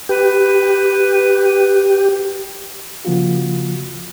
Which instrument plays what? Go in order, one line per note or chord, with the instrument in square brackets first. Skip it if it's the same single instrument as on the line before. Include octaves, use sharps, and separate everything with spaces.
[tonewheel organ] G4 [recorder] B4
[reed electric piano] C#3 F3 A#3 F4 F#4